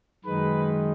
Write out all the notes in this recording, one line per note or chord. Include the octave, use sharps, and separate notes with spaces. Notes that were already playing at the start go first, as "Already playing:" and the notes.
F#2 D#3 G#3 D#4 B4